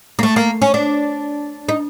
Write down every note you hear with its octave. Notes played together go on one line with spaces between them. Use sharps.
A#3
A3
A#3
C#4
D4
D#4